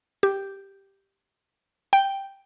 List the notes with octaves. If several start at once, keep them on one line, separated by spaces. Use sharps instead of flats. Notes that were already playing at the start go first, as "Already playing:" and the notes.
G4
G5